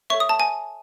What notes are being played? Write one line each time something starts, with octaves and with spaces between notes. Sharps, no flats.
A4 C#5 E5 C#6
D#6
A5
G#5